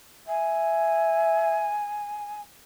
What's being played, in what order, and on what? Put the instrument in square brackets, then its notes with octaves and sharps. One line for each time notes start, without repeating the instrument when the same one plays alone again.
[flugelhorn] E5 [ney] G#5